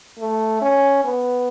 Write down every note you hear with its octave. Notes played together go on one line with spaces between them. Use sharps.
A3
C#4
B3